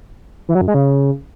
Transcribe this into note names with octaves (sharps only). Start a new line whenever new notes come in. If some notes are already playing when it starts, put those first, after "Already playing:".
E3
F#3
F#2
G#3
C#3